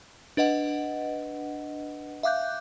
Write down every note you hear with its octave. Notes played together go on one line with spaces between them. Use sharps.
D4 B4 D#5 F#5
E5 F5 D6 F#6 G6